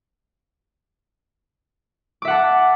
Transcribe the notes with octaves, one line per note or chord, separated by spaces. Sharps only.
E5 F#5 A5 D6